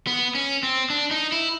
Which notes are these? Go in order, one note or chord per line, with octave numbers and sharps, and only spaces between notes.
B3
C#4
C4
D4
D#4
E4